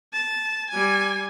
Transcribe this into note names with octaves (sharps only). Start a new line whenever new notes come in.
A5
G3 G#5